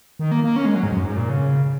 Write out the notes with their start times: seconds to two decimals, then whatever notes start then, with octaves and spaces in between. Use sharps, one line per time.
0.19 D#3
0.32 A#3
0.44 A#3
0.56 C#4
0.65 G#3
0.75 F#3
0.83 G#2
0.92 F#2
1.04 G#2
1.16 A#2
1.29 C#3